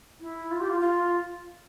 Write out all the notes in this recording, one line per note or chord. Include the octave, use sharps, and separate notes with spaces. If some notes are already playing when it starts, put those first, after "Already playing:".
E4
F4
G4
F4
F4